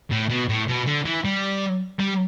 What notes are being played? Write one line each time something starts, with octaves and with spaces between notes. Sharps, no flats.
A2
B2
A2
B2
D3
E3
G3
G3